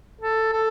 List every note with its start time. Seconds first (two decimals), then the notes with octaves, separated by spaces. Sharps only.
0.21 A4
0.52 A4